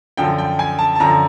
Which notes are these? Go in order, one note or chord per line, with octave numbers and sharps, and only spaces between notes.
F#2 D3 F3 G5
G5
G#5
A5
A5
F#2 D3 F3 A#5